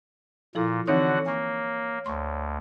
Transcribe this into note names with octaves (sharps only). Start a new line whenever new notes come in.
A#2 F3 E4 A4
D3 E3 C4 D#4 F#4 C#5 F#5
A#3 G#5 C#6
D2 C6 C#6